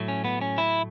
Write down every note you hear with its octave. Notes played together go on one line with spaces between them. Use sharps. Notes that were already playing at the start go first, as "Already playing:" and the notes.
Already playing: A2 F#3 A3
C#4
B3
C#4
E4